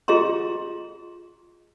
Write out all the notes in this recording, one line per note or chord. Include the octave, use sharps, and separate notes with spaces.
F4 G#4 D#5 A#5 C6